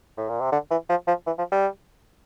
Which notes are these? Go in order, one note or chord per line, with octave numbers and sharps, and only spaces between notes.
A2
A#2
C3
D3
E3
F3
F3
E3
F3
G3